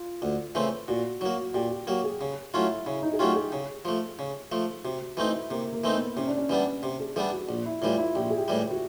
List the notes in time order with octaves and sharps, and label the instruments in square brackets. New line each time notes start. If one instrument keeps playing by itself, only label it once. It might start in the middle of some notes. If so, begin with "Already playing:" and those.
Already playing: [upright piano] F4
[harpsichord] D2
C#3 E3 A3 C4
[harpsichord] A#2 [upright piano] F#4
[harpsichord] F#3 A#3 [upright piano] F#4
[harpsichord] A#2 [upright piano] G4
[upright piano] G4
[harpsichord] F#3 A#3 [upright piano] G4
[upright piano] G#4
[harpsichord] C#3
[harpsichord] F#3 A3 C#4 F4 [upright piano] E4
[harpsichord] C#3 [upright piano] E4
[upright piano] D#4
G#4
[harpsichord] F#3 A3 C#4 F4 [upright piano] G4
[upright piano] G#4
[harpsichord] C#3
F3 A3
C#3
F3 A3
[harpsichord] C3 [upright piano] F#4
[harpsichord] E3 A3 C4 D#4 [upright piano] E4
[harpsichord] C3 [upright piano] A#3
[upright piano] A#3
[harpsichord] E3 A3 C4 D#4
[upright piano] B3
[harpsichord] C3 [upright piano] C#4
[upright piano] D4
C#4
[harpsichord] E3 G3 B3 D4 [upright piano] C#4
[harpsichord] C3 [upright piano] G4
[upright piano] G#4
[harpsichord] E3 G3 B3 D4 [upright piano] G#4
[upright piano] F#4
[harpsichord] A#1
[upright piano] E4
[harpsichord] A2 E3 G3 [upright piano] F4
[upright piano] E4
[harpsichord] A#1 [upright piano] G4
[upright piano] G#4
G4
[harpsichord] A2 E3 G3
[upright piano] F#4